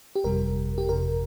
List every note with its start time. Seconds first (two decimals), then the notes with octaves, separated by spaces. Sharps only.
0.15 G4
0.24 G1 F2 C3 G3 A#4
0.78 G4
0.89 G1 F2 C3 A#4